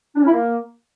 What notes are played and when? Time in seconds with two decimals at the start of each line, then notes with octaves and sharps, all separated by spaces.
0.15 D4
0.20 C#4
0.26 E4
0.31 A#3